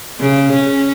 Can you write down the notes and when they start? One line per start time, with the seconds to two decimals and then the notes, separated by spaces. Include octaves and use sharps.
0.20 C#3
0.53 C#4